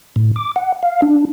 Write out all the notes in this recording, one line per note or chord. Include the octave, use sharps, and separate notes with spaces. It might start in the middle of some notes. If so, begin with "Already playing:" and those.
A2
D6
F#5
F5
D4